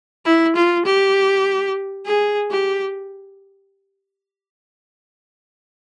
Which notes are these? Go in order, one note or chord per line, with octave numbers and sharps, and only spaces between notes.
E4
F4
G4
G#4
G4